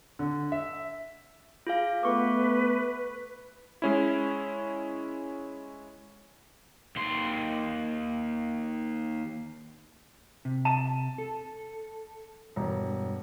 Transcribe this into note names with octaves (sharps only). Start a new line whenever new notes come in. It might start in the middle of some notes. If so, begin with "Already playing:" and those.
D3
E5
F4 G#4 F5
A3 B3 B4 C#6 D6
G#3 C#4 E4
D#2 C6
C3
A5 D#7 E7
A4
E1 G2